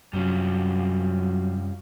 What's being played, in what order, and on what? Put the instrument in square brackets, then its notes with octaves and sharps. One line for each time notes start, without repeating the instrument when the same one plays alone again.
[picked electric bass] F#2 C3 [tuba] F#3 [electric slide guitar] G3 C#4 F4